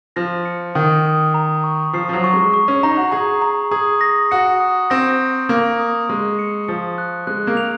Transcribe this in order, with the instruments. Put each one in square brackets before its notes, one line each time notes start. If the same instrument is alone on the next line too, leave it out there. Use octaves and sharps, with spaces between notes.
[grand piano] F3 [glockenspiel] A#6
[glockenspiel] C#7
[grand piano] D#3 [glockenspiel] D#6
[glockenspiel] D#6
A#5
C#6
[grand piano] F3 [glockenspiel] C7
[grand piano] F3
F#3
[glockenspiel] C#6
[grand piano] G#3
[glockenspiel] C#6
[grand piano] C#4
[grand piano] D#4 [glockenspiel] A#5
[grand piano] F#4
[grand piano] G#4 [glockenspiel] A#5
[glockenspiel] A#5
[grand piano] G#4 [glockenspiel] D#6
[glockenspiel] A#6
[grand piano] F#4 [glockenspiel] C#7
[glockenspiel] D#6
[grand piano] C4 [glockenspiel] A#6
[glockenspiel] D#6
[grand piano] A#3 [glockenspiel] A#6
[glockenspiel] D#6
[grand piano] G#3 [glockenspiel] C#6
[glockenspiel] C#7
[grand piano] F3 [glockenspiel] C#7
[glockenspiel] F#6
[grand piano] G#3 [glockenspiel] F#6
[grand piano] A#3
[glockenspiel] F7